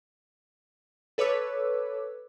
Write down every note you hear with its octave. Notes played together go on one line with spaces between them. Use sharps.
A4 B4 C#5 D6 E6